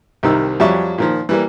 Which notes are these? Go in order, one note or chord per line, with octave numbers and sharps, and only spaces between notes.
C2 C3 D#3 D#4 E6
F2 F#3 G3 C#5 E5 C#6
A#2 D#3 F3
E3 G3 A#3